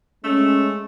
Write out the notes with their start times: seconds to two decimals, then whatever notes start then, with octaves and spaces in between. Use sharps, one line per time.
0.24 G#3 A3 C#4